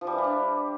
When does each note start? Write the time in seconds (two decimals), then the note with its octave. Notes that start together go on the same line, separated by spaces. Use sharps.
0.01 F3
0.07 G3
0.13 E3
0.18 G3
0.24 D4